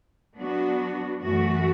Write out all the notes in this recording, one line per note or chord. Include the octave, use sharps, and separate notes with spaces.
F#3 B3 D4 F#4
F#2 E3 A3 F#4